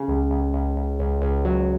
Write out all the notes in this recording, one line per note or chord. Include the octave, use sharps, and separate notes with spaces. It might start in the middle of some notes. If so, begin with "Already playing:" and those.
Already playing: C#3
C#2
C#2
C#2
C#2
C#2
C#2
F#3